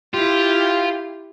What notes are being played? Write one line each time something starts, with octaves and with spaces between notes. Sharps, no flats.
E4 F4 G4